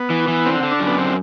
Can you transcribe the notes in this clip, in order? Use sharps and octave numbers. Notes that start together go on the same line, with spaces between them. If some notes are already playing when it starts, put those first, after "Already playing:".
Already playing: B3
E3
E3
D3 C4
D3
D4
F#2
B3
D3 C4